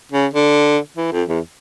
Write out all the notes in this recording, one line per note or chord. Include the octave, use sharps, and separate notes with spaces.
C#3
D3
E3
F2
E2